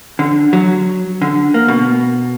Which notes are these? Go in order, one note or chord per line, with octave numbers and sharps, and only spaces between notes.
D3
F#3
D3
A#3
B2